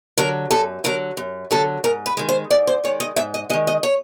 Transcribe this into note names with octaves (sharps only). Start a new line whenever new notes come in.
D3 F#3 A#4
F#2 A4
D3 F#3 A#4
F#2
D3 F#3 A4
G#2 A#4
B4
D#3 G#3
C5
G#2 D5
C5
D#3 G#3 C#5
D#5
G#2 E5
D#5
D#3 G#3 D#5
D#5
C#5